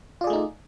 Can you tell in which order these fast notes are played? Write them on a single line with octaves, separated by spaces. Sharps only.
F4 D5 G#4 A3 D#4